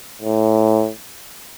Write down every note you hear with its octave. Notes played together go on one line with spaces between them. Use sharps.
A2